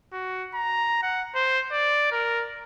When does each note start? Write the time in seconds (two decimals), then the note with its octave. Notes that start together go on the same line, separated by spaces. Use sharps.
0.12 F#4
0.54 A#5
1.03 F#5
1.35 C5
1.72 D5
2.12 A#4